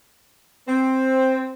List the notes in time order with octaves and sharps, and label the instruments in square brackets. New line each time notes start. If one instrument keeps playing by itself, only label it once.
[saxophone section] C4